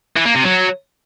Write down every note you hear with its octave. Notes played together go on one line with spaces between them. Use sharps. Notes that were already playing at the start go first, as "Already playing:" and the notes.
E3
A#3
C3
F#3